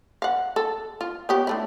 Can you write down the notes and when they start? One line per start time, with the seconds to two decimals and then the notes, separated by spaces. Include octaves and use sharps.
0.22 F5 F#5
0.56 A4
1.01 F4
1.29 B3 G4 C#5
1.47 D3 A3 E4